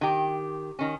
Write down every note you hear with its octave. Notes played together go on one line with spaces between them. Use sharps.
D#3 G4
D#3 C#4